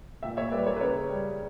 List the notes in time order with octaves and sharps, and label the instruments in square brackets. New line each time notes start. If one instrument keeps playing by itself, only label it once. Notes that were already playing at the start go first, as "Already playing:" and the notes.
[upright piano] A#2 E5 G5
C#5 E5
G3 B4 D5
A#4 C#5
B4
C#3 A#4 C#5
G3